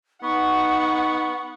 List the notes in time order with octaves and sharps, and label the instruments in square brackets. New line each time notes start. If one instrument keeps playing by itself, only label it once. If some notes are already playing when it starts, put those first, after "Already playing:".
[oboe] B3 [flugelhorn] D#4 [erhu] F#5 [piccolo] C#6